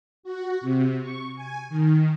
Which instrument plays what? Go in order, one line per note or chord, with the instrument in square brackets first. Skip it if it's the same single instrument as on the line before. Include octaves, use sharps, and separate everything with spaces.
[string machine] F#4
C3
C#6
G#5
D#3